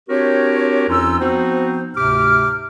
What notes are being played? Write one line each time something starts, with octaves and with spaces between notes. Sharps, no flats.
C4 D4 F#4 G4 A#4 C#5
F2 F3 C#4 D#4 F4 E6
F3 B3 C4 D#4 F#4 C5
D2 G#2 C3 G4 D6 F6